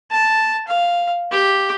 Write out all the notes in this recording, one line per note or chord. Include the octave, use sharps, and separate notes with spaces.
A5
F5
G4